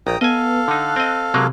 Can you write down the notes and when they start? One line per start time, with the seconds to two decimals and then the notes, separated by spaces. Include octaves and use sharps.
0.07 A#1 G5 A#5 D#6
0.21 B3 A4 D#5 F5 G#5
0.68 D3 D#4 F#6
0.96 C4 D#5
1.34 C3 F#3 G#3 A#3